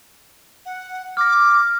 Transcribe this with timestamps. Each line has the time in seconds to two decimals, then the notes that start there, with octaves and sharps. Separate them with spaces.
0.65 F#5
1.17 D6 F6 A#6